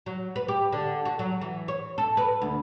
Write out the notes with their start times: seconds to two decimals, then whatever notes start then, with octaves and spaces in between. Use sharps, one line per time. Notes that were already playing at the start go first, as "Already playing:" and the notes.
0.06 F#3
0.36 B4
0.48 G4
0.72 D3
1.05 F#4
1.19 F#3
1.41 E3
1.68 C#5
1.98 A4
2.17 B4
2.42 D2